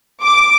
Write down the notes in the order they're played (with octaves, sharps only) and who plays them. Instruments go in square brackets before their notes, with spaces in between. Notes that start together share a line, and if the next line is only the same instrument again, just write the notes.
[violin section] D6